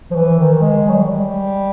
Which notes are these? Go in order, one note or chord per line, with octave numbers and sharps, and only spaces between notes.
F3
E3
D#3
G#3
F#3
G3